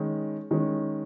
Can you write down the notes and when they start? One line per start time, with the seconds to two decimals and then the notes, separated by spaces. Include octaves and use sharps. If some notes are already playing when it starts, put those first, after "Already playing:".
Already playing: D#3 G#3 C#4
0.51 D#3 G#3 C#4